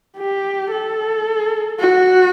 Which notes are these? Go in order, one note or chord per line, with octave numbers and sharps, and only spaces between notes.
G4
A4
F#4